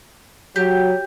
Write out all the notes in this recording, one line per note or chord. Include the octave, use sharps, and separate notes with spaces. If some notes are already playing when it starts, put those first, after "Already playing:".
F#3 G4